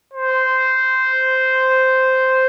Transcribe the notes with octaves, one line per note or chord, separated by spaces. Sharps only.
C5